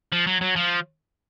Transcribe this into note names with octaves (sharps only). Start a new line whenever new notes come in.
F3
F#3
F#3
F3